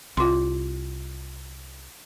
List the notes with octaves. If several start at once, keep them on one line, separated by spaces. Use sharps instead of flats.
C2 F4 C6